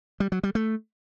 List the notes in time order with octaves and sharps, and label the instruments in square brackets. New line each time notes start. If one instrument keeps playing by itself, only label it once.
[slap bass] G3
F#3
G3
A3